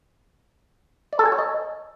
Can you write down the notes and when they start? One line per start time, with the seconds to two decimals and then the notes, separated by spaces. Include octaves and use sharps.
1.13 D5
1.19 A4
1.26 G#5
1.32 C#5
1.38 D#5